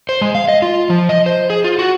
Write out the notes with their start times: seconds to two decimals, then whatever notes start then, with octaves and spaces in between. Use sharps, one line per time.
0.09 C5
0.22 G#3
0.35 F5
0.48 D#5
0.62 F4
0.90 F3
1.09 D#5
1.26 C5
1.50 G#4
1.64 F4
1.79 F#4